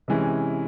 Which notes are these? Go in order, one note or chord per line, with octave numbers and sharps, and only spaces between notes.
C3 E3 G#3 C#4